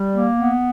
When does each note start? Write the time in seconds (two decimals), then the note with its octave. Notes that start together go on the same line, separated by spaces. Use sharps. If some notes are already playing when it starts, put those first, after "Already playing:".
Already playing: G3
0.14 A#3
0.38 B3